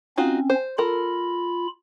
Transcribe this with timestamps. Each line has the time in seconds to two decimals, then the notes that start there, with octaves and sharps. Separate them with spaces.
0.18 C4 C#4 D#4 F4 F#4
0.50 C5
0.78 F4 A4 A#4 B5